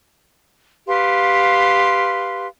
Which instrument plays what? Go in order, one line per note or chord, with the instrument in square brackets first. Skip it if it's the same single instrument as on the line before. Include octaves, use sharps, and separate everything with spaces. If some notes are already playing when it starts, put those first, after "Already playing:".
[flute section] G4 B4 F5 C6